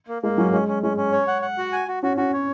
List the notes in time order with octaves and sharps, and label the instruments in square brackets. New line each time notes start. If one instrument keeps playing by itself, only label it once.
[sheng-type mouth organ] A#3
[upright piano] G#3 [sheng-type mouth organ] A#3
[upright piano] F#3 [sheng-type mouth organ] C#4
[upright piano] G#3 [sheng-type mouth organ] C#4
[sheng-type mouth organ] C#4
[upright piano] G#3 [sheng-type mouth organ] C#4
[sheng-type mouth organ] C#4
C#5
F#5
F#5
F#4
G#5
F#4
[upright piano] C#4 [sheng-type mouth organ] F#4
[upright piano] C#4 [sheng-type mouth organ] F#4
[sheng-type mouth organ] C#5